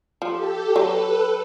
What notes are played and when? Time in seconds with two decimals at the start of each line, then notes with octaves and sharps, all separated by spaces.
0.22 F3 G4 A4
0.75 F#3 A4 B4